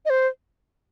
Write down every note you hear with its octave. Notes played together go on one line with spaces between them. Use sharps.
D#5
C5